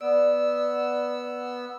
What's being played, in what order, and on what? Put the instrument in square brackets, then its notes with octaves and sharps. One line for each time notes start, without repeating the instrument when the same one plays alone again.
[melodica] B3 E6 [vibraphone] D5